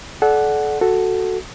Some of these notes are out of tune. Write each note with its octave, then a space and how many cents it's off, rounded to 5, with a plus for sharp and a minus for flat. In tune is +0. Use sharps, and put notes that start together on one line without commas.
A4 -35 D5 +0 F#5 +0
F#4 +0 A4 +0